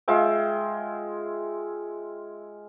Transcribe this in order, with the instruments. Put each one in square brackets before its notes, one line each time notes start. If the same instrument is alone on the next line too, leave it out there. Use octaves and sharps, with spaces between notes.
[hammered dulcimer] G#3 F4 E5 G5